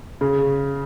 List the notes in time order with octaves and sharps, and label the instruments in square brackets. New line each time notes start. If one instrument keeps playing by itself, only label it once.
[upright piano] C#3